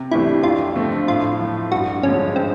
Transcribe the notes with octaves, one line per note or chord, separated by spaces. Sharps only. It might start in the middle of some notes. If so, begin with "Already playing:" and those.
Already playing: C3
E3 A3 D4 E4 G4
F2 F4
D3 F3 A3 C4
A2 F4
F3 A3
G2 F#4
D3 F3 G#3 C#4
C4